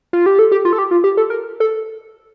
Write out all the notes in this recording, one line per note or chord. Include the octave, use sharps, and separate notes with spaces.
F4
G4
A4
G4
F4
A4
G4
F4
G4
A4
A#4
A4